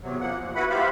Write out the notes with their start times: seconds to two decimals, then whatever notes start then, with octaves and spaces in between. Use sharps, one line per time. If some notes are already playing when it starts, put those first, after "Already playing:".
0.01 E2 C3 F#3
0.20 F#2 F3 A#3 F#5
0.40 D#2
0.55 E4 F#4 B4 F#5 B5
0.69 F4 G4 C5 E5 F5 B5